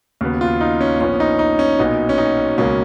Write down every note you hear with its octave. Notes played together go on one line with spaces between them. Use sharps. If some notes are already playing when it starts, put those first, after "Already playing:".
D#2 C#3 F#3 B3
F4
D#4
C#4
A#1 A#2 F3 B3 C#4
D#4
D#4
C#4
B1 A#2 F#3 B3 D#4
C#4
D#4
C#2 B2 F#3 A#3 C#4